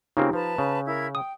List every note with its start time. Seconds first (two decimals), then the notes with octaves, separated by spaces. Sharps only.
0.17 C#3 A#3 C4 D#4 F4 G4
0.33 F3 B4 A5 A#5
0.58 C#3
0.86 E4 A#4 G#6
1.15 G5 D#6